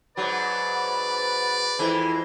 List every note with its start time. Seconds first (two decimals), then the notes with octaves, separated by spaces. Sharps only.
0.17 G#2 F#3 B4 D5
1.79 F2 E3 G#3 E4